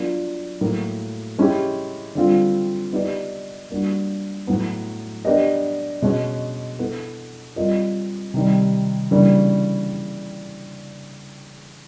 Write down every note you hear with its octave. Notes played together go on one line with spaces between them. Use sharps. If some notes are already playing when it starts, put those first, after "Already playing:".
Already playing: F#3 B3 D4 F4 A#4
A2 F#3 A#3
G#3 C#4 E4 G4
D3 G3 C4 F4
B3 D#4 G4 B4 D5
G3 A#3 D4 F#4
A2 F#3 B3
B3 D4 G4 A#4 D#5
B2 G#3 C#4
B3 E4 A4
G3 C4 F4 A#4 D#5
C3 D#3 G3
C#3 E3 G3 A#3 D4